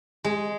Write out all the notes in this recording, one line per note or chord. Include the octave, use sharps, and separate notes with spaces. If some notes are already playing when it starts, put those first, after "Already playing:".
G#3